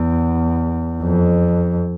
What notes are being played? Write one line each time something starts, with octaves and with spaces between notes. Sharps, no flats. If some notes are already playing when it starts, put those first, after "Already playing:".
Already playing: E2
F2